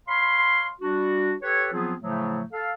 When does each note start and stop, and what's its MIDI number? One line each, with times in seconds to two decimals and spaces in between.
0.08 0.69 73
0.08 0.69 77
0.08 0.69 83
0.08 0.69 84
0.81 1.34 55
0.81 1.34 62
0.81 1.34 66
1.42 1.69 67
1.42 1.69 69
1.42 1.69 71
1.42 1.69 73
1.73 1.95 53
1.73 1.95 54
1.73 1.95 59
1.73 1.95 60
1.73 1.95 65
1.73 1.95 68
2.01 2.42 45
2.01 2.42 49
2.01 2.42 53
2.01 2.42 54
2.01 2.42 57
2.53 2.73 69
2.53 2.73 77